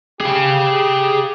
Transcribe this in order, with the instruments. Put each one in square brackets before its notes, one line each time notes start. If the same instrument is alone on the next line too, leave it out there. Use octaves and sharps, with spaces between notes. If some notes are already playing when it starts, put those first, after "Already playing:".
[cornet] G4 [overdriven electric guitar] G#4 F5